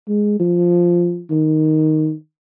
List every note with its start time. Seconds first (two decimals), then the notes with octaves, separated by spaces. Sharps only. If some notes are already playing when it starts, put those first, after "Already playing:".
0.08 G#3
0.40 F3
1.30 D#3